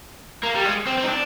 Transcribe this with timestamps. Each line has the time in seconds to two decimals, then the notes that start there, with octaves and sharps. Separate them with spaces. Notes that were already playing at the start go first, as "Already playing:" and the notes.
0.43 A#3
0.55 G3
0.65 G#3
0.87 C4
0.98 C4
1.03 D#4
1.08 D4